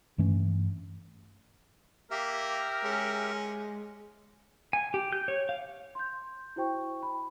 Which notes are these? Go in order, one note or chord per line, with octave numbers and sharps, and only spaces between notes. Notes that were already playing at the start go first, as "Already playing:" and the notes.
G2 E3 A3 C#4
A#3 G4 A#4 E5
G#3 C#4
G#5
G4
G6
C#5
F5
C6 G6
E4 F#4 C5 G5 C#6
B5